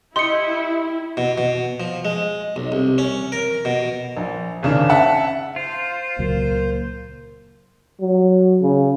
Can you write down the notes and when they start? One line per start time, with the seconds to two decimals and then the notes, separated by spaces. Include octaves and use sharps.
0.16 E4 G4 D#5 C6 C#7
1.17 B2
1.38 B2
1.80 F3
2.05 G#3
2.56 B1
2.72 C2
2.98 C#4
3.32 A#4
3.65 B2
4.17 A#1
4.63 G#1 C#3 D4
4.90 E5 F#5 A5
5.56 F4 C5
6.19 C#2 A#2 F#3 A#3
8.01 F#3
8.62 C#3